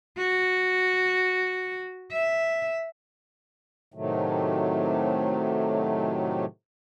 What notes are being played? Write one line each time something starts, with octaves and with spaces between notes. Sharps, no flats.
F#4
E5
A2 C3 D#3 F#3 A3